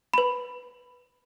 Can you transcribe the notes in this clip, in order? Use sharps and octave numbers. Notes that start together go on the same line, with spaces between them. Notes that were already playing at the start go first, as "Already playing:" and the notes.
B4 B5